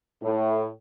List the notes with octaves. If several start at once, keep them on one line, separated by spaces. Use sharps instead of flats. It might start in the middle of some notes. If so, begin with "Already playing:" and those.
A2